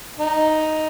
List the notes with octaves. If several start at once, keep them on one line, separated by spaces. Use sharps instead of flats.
D#4